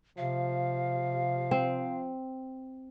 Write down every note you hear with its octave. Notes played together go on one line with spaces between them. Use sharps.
C3 F3 F5
C4